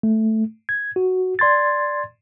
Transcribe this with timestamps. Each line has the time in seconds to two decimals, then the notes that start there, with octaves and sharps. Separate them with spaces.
0.03 A3
0.69 G#6
0.96 F#4
1.39 D5 C6 G#6 A6